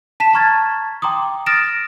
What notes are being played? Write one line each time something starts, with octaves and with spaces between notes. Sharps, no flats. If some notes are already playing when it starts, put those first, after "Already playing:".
A5 B6 E7
A5 A#5 C#6 F6 G#6 A6
G5 A#5 C6 D6 D#6
D#6 F6 A6 A#6 D7 E7